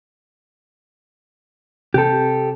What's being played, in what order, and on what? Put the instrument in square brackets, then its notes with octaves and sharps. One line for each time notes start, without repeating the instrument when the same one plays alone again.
[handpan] C3 [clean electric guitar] G4 A4